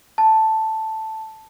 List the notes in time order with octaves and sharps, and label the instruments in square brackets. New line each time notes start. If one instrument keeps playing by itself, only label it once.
[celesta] A5